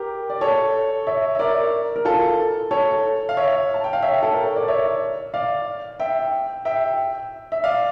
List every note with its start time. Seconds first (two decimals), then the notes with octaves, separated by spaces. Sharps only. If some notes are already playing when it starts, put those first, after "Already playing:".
Already playing: G4 A#4
0.30 D5
0.41 A4 C#5
1.07 C#5 E5
1.35 E5
1.39 A#4 D5
1.96 A#4
2.05 F4 A4
2.71 A4 C#5
3.29 F5
3.37 C#5 E5
3.74 A5
3.84 G5
3.93 F5
4.02 C#5 E5
4.23 A4
4.33 A#4
4.45 C#5
4.56 D5
4.68 C#5 E5
5.34 D5 F5
6.00 E5 G5
6.65 E5 G5
7.52 E5
7.64 D5 F5